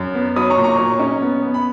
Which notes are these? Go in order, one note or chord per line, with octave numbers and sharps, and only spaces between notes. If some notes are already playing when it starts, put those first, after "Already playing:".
Already playing: F#2
B3
F#3 B5 D#6
A#5 C#6
A#2
A#5 C#6
F#3
C#4
B3
B3
B5